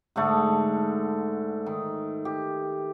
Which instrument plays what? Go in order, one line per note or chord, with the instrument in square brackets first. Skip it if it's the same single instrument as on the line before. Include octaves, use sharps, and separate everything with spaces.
[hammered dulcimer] G#2 D3 A3
D#3
G4